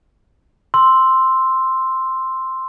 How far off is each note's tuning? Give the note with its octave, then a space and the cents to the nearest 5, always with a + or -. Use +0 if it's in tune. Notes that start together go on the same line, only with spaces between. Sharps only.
C6 +0 E6 +0